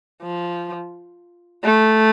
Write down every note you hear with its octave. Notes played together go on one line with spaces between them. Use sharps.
F3
A3